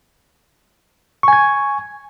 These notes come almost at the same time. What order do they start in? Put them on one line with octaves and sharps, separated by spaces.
C#6 G#5 G#6